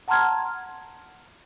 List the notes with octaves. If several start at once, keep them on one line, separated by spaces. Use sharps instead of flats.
F#5 A5 A#5 C6 F6 G#6